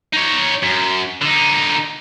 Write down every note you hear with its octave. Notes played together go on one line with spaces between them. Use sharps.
D#4 C#5
F#2
D3 D#4